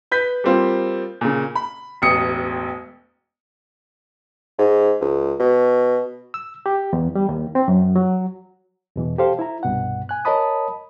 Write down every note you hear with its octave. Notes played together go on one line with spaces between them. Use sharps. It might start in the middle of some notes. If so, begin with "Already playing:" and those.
B4 G6 B6
G3 A#3 C4 F4
A#2 C#3
B5
E1 A1 D#6 C#7
G#2
C#2
B2
E6
G4
E2
G3
D#2
C4
F#2
F#3
E2 B2 E3
G4 A4 C5 F5
E4 A#5
C2 G2 B2 F#5
G#5 F#6
A#4 C#5 D#5 A5 B5 D#6